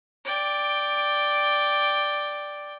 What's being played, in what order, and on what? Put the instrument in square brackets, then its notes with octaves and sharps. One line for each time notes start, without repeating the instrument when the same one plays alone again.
[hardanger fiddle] D5 G5